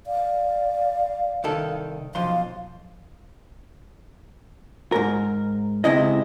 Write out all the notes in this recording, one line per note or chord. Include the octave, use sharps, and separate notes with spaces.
D5 F5
C2 D#3 A4
B1 F3 F5 C6
G#2 A#4
C#2 C3 E4 D#5